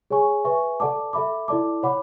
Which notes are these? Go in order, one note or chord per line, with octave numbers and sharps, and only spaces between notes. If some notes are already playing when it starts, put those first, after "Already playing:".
G#4 C#5 G#5 C#6
B4 E5 G#5 C#6
A4 D5 F#5 A5 D6
A4 E5 B5 D6
E4 A4 D5 A5 D6
C#5 F#5 B5 D6